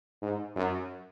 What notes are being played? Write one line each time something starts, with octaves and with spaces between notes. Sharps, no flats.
G#2
F#2